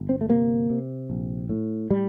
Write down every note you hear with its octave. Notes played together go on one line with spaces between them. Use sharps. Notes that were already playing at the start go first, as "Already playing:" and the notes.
Already playing: G1
C4
A3
C3 A#3
C3
A#1
A2
A2 G3